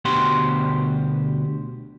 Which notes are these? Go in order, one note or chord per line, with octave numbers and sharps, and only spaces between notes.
D2 B2 G4 C5 F#5 C6